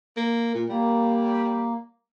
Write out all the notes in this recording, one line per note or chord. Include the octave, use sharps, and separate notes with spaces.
A#3
A#2
G3 A#3